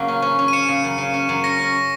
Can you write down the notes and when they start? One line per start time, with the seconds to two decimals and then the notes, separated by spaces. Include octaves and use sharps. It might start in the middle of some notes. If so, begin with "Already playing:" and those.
Already playing: C#3 F#3 A#3
0.08 C#4
0.22 C#4
0.39 C#4
0.48 D#7
0.53 C#4 C#7 E7
0.68 C#3
0.84 F#2
0.98 C#3
1.14 C#4
1.29 F#2
1.44 C#4 A#6 C#7
1.59 C#4
1.67 A#6